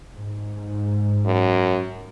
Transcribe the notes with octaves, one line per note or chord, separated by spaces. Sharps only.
G#2
F#2